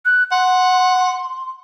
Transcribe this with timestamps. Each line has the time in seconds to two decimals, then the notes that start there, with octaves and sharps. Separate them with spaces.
0.05 F#6
0.31 F#5 C6